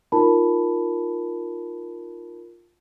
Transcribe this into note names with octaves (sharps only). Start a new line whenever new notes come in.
D#4 F4 A#4 A5 B5